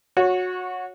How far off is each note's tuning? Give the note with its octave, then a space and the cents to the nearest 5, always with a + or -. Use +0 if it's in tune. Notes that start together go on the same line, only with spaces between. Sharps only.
F#4 -20 C#5 +0